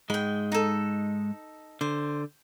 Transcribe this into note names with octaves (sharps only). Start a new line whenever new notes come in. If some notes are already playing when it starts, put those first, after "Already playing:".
G#2 G#3 G5 B5
D#4 A4
D3 C5